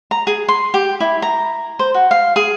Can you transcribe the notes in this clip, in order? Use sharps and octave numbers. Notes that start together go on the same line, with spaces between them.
A#5
G#4
C6
G4
E4
A#5
C5
F#4
F5
G#4